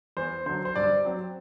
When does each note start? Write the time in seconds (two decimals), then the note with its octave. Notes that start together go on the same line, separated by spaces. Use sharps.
0.17 E2 C5
0.46 D3 F#3 C5
0.65 C5
0.76 G2 D5
1.05 F#3 C4